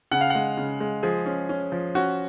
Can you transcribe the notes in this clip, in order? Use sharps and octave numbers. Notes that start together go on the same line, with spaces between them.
C#3 F#5
F5
F#5
G#3
C#3
G#3
F3 G#4
C#4
C#4
F3
C#4 F#4